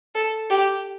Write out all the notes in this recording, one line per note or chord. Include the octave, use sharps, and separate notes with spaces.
A4
G4